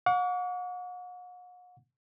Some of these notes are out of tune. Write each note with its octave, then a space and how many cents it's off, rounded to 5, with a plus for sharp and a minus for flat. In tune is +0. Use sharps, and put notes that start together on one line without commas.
F#5 -40 C#6 +45